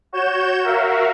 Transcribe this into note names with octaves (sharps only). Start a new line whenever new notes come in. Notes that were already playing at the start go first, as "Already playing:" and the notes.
F#4 C#5 G6 E7
F#4 A#4 E5 F5